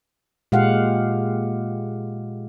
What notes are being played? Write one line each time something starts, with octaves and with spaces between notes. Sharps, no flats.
A#2 G#3 G4 F5 F#5